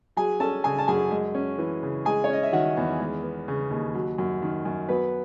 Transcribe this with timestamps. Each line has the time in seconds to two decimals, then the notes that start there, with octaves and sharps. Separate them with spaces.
0.17 F#3 G#4 G#5
0.40 C#4 A4 A5
0.64 C#3 G#4 G#5
0.79 A5
0.88 F#2 G#4 G#5
1.11 G#3
1.35 C#4
1.59 E3
1.83 C#3
2.05 G#3 G#4 G#5
2.24 C#5
2.29 C#4 D#5
2.43 E5
2.52 D#3 F#4 F#5
2.77 E2
3.00 G#3
3.23 B3
3.48 C#3
3.71 D#2
3.94 F#3
4.18 F#2
4.42 D#3
4.65 F#2
4.89 F#3 B3 B4